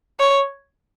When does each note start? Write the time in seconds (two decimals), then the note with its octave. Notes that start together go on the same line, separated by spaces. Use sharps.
0.19 C#5